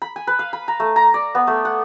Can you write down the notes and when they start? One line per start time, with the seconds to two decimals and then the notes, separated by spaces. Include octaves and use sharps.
0.02 B5
0.16 G#5
0.27 B4
0.39 F5
0.53 B5
0.68 A#5
0.80 A3
0.96 A#5
1.14 D5
1.35 B3
1.47 A3
1.65 F#5